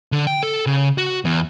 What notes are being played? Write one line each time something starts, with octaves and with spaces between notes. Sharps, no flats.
D3
G5
A4
C#3
F#4
E2